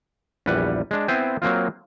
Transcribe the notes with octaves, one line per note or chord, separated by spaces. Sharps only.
A#1 E2 G3 B4 F#5
G#3 D4
B3 C4 E4 C5 G5 G#5
F#3 A#3 C4 F4